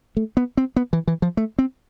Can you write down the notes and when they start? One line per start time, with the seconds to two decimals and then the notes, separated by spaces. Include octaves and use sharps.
0.17 A3
0.37 B3
0.57 C4
0.76 B3
0.93 E3
1.08 E3
1.22 F3
1.37 A3
1.59 C4